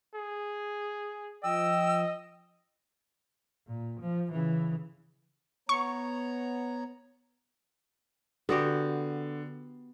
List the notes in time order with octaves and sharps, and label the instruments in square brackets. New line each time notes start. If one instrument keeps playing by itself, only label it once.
[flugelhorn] G#4
[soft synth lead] F3 [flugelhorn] D#5 [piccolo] G5 [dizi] E6
[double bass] A#2
F3
C#3 E3
[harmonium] B3 C#5 A#5 [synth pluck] C#6
[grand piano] D3 [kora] B3 F#4 G4